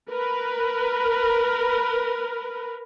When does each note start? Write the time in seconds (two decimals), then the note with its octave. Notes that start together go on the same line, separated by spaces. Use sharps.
0.11 A#4 B4